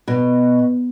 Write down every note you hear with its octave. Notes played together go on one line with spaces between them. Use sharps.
B2